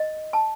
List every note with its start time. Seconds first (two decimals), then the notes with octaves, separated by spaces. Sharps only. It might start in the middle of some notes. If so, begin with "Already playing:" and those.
Already playing: D#5
0.33 A5